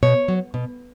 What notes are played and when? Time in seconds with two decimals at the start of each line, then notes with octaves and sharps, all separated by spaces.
0.03 B2 C#5
0.28 F#3
0.54 B2